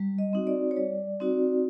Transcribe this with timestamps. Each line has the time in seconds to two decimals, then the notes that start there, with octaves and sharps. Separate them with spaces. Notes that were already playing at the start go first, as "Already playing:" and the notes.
Already playing: G3
0.18 D#5
0.33 C4 D#4 F#4
0.47 D5
0.71 C#5
0.76 G3 D5
1.20 C4 D#4 F#4